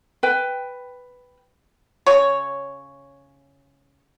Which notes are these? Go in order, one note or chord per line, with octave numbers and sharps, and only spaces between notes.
B4 G5
C#3 C#5